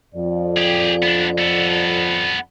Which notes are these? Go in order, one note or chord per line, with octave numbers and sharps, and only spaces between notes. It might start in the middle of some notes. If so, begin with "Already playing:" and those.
F2 F3 D5
G4 G#4
B3 D4
B3 A4